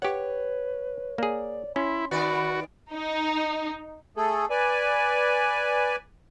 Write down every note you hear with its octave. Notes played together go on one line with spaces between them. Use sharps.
G4 B4 C#5 F#5
A#3 G#4 D5
C#4 E4 C6
D#3 B3 F#4 D5 B5
D#4
A3 G#4 A4
B4 D5 G#5